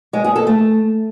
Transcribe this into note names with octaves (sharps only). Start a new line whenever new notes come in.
G#3
G#4
A4
A3